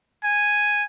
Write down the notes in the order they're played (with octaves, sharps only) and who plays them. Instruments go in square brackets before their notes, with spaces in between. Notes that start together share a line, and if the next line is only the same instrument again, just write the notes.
[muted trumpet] G#5